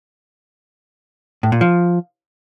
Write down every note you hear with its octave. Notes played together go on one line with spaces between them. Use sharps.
A2
A#2
F3